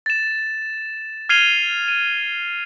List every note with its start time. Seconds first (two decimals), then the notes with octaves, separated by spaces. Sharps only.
0.06 A6 E7
1.29 F6 G#6 C7 D#7 F7 G7
1.88 D#7